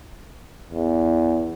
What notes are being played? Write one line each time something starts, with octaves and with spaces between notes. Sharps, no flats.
E2